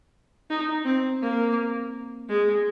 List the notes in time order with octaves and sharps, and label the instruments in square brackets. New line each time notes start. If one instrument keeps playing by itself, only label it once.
[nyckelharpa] D#4
C4
A#3
G#3